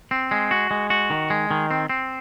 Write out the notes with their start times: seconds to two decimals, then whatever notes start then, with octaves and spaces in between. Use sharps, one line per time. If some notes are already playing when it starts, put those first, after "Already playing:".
0.11 C4
0.31 G#3
0.51 F#4
0.71 G#3
0.90 F#4
1.10 D#3
1.30 G#3
1.51 D#3
1.71 C4
1.90 C4